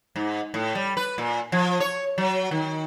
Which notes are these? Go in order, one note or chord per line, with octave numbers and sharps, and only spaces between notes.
G#2
A2
G3
B4
A#2
F3
C#5
F#3
D#3